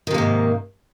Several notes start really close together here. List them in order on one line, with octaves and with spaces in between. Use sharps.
D#3 C3 A#3 G#2